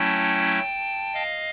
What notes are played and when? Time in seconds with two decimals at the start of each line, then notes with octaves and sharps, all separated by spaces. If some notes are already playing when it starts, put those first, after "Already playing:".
Already playing: F#3 A3 C#4 E4 G5 A5
1.14 D#5 F5